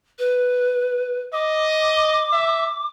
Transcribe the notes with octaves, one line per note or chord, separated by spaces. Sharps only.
B4
D#5 D6
E5